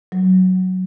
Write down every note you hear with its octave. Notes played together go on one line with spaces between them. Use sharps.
F#3